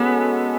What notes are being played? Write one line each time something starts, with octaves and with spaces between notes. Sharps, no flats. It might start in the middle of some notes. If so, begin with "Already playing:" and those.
Already playing: G#3 B3 C#4 F#4 A4